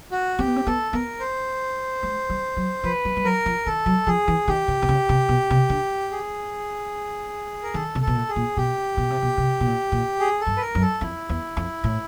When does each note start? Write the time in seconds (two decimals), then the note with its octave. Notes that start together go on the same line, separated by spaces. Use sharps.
0.12 F#4
0.39 C4 G4
0.47 B3
0.56 C4
0.67 B3 A4
0.93 B3 A#4
1.20 C5
2.03 G#3
2.30 G3
2.57 F#3
2.84 F3 B4
3.05 G3
3.17 G3
3.24 F#3 A#4
3.46 F3
3.66 D#3 A4
3.86 F#3
4.07 F3 G#4
4.28 E3
4.48 D#3 G4
4.68 C#3
4.82 C3
4.89 C#3
5.09 C3
5.29 B2
5.50 C3
5.70 D3
6.12 G#4
7.63 A#4
7.74 D#3 A4
7.95 C3
8.02 A4
8.07 B2
8.15 A#2
8.29 G#4
8.36 A#2
8.57 B2 G4
8.97 B2
9.10 C3
9.22 B2
9.38 C3
9.60 B2
9.66 A#2
9.92 A#2
10.20 G#4
10.41 A4
10.47 G2
10.57 B4
10.61 A#4
10.75 F#2
10.81 A4
11.01 F2 E4
11.29 E2
11.57 F2
11.84 A2